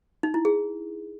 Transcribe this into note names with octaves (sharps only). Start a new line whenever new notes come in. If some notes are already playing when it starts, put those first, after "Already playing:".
D#4
E4
G#4